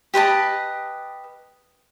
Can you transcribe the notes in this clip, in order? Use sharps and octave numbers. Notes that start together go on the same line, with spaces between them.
G4 B4 D#5 A5